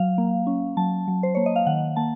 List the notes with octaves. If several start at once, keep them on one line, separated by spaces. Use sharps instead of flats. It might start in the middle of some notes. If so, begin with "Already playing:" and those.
Already playing: F#3 F5
A#3
C#4
F#3 A5
F#3
C5
A#3 C#5
D#5
F5
D#3 F#5
A#3 A5